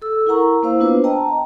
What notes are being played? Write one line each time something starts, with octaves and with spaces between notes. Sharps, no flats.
A4 E6
E4 A#4 F#5 A#5 C#6
A#3 E4 C5 F5 E6
B3 D4 F4 B4 C5
D#5 G5 A5 A#5